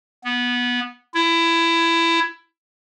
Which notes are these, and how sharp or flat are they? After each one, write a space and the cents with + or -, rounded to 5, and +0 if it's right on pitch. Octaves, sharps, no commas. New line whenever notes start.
B3 -15
E4 +20